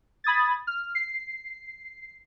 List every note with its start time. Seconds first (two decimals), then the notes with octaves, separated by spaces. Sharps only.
0.24 B5 D#6 G#6 A6
0.67 F6
0.95 C7